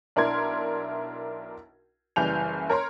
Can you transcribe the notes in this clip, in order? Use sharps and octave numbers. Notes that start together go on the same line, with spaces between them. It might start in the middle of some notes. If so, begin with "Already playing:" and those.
B1 D4 E4 A#4 C6 G#6
F#1 E3 G3 G#5 G6 F7
A#4 C#5 A#5 C6